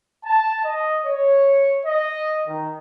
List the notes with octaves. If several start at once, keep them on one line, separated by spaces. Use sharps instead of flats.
A5
D#5
C#5
D#5
D#3